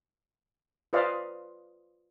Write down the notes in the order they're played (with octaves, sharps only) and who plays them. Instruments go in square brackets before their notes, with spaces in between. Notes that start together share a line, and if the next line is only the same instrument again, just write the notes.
[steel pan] F4 B4 C5 D5 D#5 F5